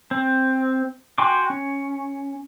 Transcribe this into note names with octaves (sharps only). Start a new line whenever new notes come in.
C4
F#4 G5 G#5 C6 D6
C#4